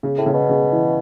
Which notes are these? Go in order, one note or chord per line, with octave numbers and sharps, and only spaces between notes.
C#3
A2
C#3
B2
C#3
E3